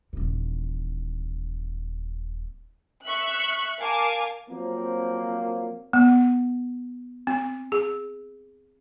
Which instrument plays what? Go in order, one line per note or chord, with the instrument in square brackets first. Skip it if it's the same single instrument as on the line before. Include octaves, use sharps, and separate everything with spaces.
[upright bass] D#1 E3
[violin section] E5 C#6 F#6
A#4 F5 G#5 A5 D6
[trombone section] F3 F#3 A#3 [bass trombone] C4
[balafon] B3
C4
G#4